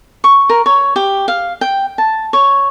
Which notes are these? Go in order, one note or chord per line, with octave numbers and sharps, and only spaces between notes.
C#6
A#4
C#5
G4
F5
G5
A5
C#5